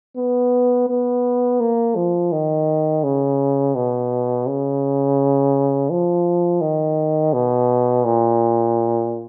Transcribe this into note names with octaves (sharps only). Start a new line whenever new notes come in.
B3
B3
A#3
F3
D#3
C#3
B2
C#3
F3
D#3
B2
A#2